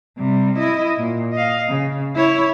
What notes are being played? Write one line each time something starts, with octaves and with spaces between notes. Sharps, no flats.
C3 G3
E4 D#5
A#2
D#5 F5
C#3
E4 C#5